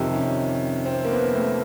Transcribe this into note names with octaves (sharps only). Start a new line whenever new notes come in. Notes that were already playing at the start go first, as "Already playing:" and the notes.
Already playing: F2 C3 D#3
C#4
C4
A#3
B3
A3